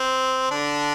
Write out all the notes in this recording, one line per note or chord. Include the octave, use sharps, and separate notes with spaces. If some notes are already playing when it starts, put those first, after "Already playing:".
Already playing: C4
D3 D4